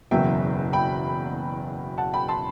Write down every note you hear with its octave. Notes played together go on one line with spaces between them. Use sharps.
F#1 E2 B2 F#3 E5 G5
G5 B5
F#5 A5
G5 B5
A5 C6